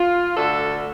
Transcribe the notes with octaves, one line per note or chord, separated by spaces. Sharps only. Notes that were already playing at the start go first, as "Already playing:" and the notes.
Already playing: F4
D2 D3 A3 A4